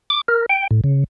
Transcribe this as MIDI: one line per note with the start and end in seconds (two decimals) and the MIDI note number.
0.10 0.21 86
0.28 0.46 70
0.49 0.67 79
0.71 0.81 45
0.84 1.04 49